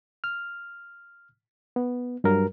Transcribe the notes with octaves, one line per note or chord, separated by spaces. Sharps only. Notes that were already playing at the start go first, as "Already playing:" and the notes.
F6
B3
G2 F#3 A#4